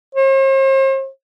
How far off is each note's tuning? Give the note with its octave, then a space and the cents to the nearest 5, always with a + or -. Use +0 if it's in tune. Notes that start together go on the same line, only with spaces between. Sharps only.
C5 +45